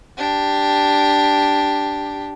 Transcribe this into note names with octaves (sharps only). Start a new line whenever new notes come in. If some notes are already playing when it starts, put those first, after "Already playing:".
D4 G4